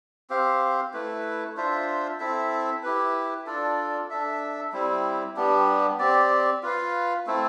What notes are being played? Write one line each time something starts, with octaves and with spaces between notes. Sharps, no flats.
C4 G4 C5 F5
A3 E4 B4
D4 F4 C5 E5
C4 E4 A4 E5
E4 G4 B4
D4 F4 A4 D5
D4 A4 E5
G3 C4 E4
G3 B3 D4 G4
C4 G4 D5
F4 B4 F5
A3 C4 E4 A4